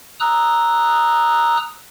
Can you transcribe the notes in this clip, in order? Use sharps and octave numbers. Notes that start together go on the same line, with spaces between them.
A#5 D#6 E6 F#6